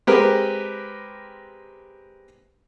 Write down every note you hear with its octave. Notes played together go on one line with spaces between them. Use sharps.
G#3 C4 G4 A#4 B4